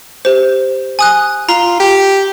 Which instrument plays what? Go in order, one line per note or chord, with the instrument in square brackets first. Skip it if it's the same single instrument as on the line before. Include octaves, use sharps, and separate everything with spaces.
[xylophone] G4 C5
G#5 D#6 F#6
[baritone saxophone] F4 [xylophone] A#5
[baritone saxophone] G4